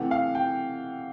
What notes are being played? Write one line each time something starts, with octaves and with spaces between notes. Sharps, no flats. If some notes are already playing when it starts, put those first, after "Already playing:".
Already playing: C3 E3 A3 F#5
F5
G5